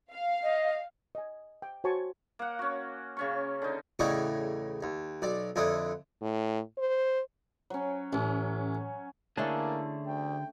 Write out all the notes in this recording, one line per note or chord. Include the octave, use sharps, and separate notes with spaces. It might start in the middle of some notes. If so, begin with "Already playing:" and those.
F5
D#5
D#5 G#5
G5
F#4 C5 C#5 G#5 A5 C#6
A#3 F#5
C#4 F#4
C#3 C#4 C#6
D3 D#4
E2 A2 C#3 D#4 D5 C#6
D#2
B1 D5
F2 D3 E4 D#6
A2
C5
F#3 C#4
A1 C#4
D3 A3 A#3 C#4 D4 E4 G#4 A5
D2 G5